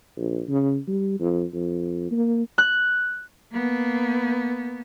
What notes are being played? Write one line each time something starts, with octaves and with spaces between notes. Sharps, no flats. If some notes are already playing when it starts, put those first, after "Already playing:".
A#1
C#3
G3
F2
F2
A#3
F#6
A#3 B3